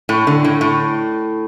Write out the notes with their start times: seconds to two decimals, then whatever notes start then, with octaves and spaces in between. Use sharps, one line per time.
0.09 A2
0.27 D3
0.44 A2
0.61 A2